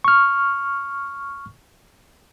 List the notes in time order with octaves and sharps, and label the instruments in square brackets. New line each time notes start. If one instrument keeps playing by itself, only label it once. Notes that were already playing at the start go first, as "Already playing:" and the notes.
[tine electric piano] C#6 F6